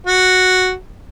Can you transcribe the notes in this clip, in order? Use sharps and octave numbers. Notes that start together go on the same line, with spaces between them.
F#4